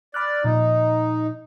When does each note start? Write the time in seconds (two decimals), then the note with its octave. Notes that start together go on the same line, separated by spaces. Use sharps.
0.14 D5 B5 F6 F#6
0.44 A#2 F3 D#4